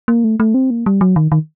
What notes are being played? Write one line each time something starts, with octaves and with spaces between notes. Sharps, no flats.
A#3
A3
A3
C4
A#3
G3
F#3
D#3
D#3